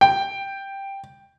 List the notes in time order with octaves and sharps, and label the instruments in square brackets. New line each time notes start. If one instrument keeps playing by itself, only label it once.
[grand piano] G5